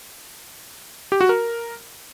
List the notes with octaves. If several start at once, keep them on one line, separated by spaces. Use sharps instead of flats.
G4
F#4
A#4